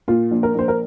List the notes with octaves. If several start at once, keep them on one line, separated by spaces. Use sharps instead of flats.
A#2 F4
A#1
A#4
A#1 C5
A#4